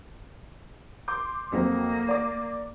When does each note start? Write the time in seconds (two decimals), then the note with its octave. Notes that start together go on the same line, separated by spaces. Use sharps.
1.08 C6 D6 G6
1.52 F2 F#3 A#3 C4
2.08 D5 D6